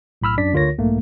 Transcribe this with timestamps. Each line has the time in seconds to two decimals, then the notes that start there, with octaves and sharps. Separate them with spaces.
0.22 B1 A2 B5 E6 F6
0.37 F#2 D4 D5 B6
0.53 D2 D3 F4 A#4 C#5 A#6
0.79 B1 G#2 A3 A#3